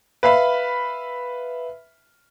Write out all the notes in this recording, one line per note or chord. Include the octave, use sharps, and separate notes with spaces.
B4 E5 F5 B5